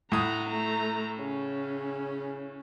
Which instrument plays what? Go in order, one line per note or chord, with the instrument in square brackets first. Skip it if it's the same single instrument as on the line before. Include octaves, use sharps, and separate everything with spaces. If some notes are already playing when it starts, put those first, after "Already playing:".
[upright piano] A2 D#6 [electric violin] F#5 A#5
[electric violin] A3 A#5
[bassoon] C#3 [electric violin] C#4